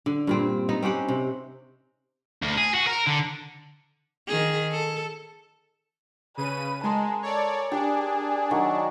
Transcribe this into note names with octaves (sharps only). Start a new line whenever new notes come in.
D3
G2 A#2 C4
B3 D#4 D#5
C4 C#4 G4 F#5
C3
D2
G#4
F#4
A#4
D3
D#3 G#4
A4
C#3 B4 D#7
G#3 A#4 G#5 A5 C6
A4 C#5 D5
D4 G4 G#4
D#3 F#3 C#6